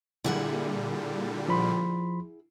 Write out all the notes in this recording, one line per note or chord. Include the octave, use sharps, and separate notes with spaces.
A#2 D3 G3 E4 G#4 F#5
F3 B5 C6